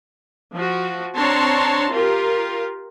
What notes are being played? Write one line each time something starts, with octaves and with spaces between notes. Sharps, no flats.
F3 F#4
C4 D4 C#5 A5 A#5 C6
F4 G4 A#4